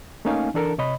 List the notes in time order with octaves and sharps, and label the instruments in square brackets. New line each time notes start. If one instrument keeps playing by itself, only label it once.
[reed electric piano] A3 A#3 C#4 D#4 F5 G#5
E3 D4 A4 A#4 A5
C3 C#5 D#5 B5